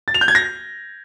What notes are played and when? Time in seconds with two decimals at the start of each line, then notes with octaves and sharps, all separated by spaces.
0.08 A6
0.14 F7
0.21 G6
0.28 G#6
0.35 A#6